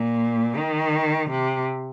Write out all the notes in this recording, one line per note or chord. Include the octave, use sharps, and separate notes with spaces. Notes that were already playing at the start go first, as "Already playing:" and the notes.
Already playing: A#2
D#3
C3